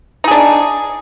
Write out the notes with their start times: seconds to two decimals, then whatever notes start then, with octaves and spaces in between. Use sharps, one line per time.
0.24 D#4
0.28 G#4
0.31 D4